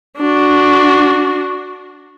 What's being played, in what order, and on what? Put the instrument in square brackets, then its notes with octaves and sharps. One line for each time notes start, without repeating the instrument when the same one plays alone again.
[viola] D4 F#4